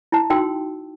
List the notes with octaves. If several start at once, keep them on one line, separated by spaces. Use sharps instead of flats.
E4 A5
D#4 F#4 G5 C6 E6